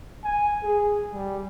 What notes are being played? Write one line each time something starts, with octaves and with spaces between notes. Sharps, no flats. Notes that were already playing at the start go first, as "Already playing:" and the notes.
G#5
G#4
G3